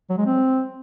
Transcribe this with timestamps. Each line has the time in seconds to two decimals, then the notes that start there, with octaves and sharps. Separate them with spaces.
0.10 F#3
0.18 G#3
0.26 C4